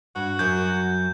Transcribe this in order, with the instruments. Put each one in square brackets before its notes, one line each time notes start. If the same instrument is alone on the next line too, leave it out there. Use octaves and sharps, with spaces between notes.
[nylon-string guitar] G2 [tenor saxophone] F#4
[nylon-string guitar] F#2 F#3 [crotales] G6